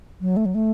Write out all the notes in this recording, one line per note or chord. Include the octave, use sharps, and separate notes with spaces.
F#3
A3
F#3
A3